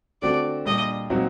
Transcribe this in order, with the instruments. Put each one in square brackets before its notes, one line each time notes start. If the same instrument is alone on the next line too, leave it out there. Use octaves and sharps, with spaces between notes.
[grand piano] D3 A3 C4 F#4 [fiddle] D5
[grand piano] A#2 G3 D4 [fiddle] D#5
[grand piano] A#2 F#3 C4 D#4 F#4